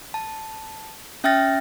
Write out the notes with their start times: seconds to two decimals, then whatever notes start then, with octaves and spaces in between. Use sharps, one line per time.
0.14 A5
1.24 C#4 E5 G5 F6 A6 A#6